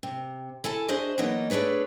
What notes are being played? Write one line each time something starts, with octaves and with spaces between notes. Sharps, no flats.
C3
E4 A4 G#5 A5
D4 F#4 G#4 C5 D#5 E5
E3 F#3 A#3 B3 D#4 D#5
A3 D4 G#4 B4 C#5